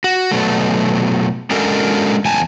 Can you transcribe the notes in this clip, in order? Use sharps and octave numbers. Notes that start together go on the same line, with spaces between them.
F#4
B2 F#3 A3
G#3 C#4 D4 F#4 A4 A#4
E2 G#5 A5